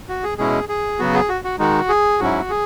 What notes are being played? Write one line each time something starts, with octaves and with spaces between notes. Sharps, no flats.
F#4
G#4
B2 G#3 C#4 E4 G#4
G#4
C#3 F#3 B3 F#4
G#4
F#4
F#4
D#3 G#3 D#4 F#4
G#4
G#2 F#3 C#4 E4 F#4
G#4